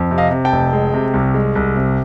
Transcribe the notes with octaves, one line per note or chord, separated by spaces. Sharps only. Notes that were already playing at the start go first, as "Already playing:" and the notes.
Already playing: F2
C3
D#5 F5
C3
G5 A5
F1
G#3
C3
C2
G#3
C2
C3